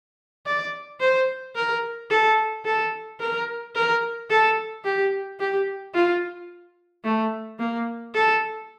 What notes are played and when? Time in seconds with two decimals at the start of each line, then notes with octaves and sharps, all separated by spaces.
0.46 D5
1.00 C5
1.55 A#4
2.10 A4
2.65 A4
3.20 A#4
3.76 A#4
4.30 A4
4.84 G4
5.40 G4
5.94 F4
7.04 A3
7.59 A#3
8.14 A4